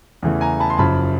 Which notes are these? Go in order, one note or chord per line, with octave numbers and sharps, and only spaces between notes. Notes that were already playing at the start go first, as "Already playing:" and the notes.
E2 C#3 E3 A3
G#5 A#5
A5 B5
C6
F#1 F#2 C#3 F3 A5 B5